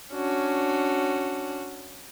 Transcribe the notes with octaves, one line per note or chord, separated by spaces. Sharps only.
C#4 D4 F#4